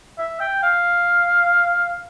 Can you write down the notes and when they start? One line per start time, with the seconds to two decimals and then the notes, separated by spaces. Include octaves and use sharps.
0.18 E5
0.40 G5
0.63 F5